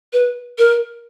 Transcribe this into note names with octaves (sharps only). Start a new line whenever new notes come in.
B4
A#4